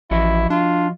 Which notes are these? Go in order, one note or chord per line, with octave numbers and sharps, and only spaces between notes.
A1 F3 E4 F#4 D#5
D4 F4